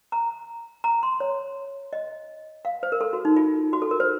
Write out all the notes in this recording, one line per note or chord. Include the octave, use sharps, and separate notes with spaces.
A#5
A#5
C6
C#5
D#5
F5
C5
A#4
A4
F#4
D#4
F4
F#4
A4
A#4
C5